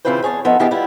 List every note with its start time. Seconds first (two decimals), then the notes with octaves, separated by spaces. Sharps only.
0.05 C#3 E3 C4 F4 B4 C5
0.22 E2 G#4 C#5 A5
0.45 F3 B3 D#4 A4 E5
0.59 D#3 B3 E4 G4 G#4 A5
0.71 G3 B3 E4 F4